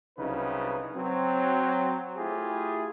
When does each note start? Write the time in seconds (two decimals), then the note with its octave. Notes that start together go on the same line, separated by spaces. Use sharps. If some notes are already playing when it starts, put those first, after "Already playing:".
0.18 C2 C#3 F#3 D#4 B4
0.96 F#3 C4
2.17 A3 E4 F4 G4 G#4